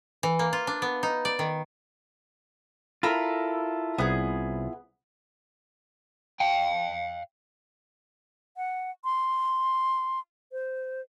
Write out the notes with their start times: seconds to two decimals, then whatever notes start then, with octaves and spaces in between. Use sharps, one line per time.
0.23 E3
0.39 A#3
0.53 F4
0.67 D4
0.82 B3
1.03 D#4
1.25 D5
1.39 D#3
3.03 E4 F4 A4 A#4 B5
3.98 C2 B3 G#4
6.40 F5 G5
8.57 F#5
9.04 C6
10.52 C5